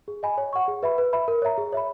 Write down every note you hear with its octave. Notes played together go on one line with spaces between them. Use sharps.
G#4
D#5 G#5 B5
C#5
F#5 C#6
G#4
B4 E5 B5
B4
E5 B5
A#4
C#5 E5 A#5
G#4
C#5 E5 B5